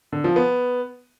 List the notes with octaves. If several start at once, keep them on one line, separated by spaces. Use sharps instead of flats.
D3
F3
B3